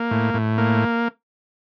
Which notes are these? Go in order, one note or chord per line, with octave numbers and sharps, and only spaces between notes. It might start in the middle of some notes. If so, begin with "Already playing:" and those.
Already playing: A#3
A2
A2
A#3